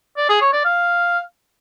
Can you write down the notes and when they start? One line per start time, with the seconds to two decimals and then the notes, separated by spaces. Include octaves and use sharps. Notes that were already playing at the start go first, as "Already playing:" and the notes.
0.17 D5
0.29 G#4
0.41 C#5
0.53 D5
0.65 F5